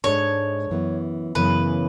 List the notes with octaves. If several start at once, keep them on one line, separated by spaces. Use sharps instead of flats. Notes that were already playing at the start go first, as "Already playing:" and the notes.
G#2 G#3 D4 A4 C#5
F#2 E3 B3
F#2 C#3 E3 B3 B4